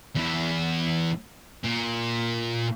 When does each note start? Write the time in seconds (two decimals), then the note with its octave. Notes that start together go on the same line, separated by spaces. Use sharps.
0.16 E2 E4
1.64 A#2